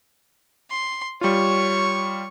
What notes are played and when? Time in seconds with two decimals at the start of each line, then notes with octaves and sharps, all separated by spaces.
0.70 C6
1.21 G3 F4 C#5 C#6